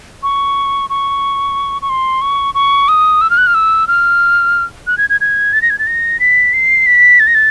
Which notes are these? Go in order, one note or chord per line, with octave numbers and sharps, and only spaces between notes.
C#6
C#6
C#6
C6
C#6
C#6
D#6
E6
F6
F#6
F6
E6
F6
F#6
G#6
G#6
G#6
A6
A#6
G#6
A6
A#6
B6
C7
B6
A6
A#6
A6